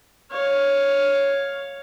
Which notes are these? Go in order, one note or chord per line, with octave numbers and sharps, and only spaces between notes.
C#5 F5